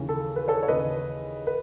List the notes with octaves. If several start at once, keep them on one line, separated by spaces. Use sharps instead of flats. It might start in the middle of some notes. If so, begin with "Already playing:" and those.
Already playing: D#2 C#3 E3
A4
B4
A4 C#5
C#5
D#2 C#3 E3 B4 D#5
B4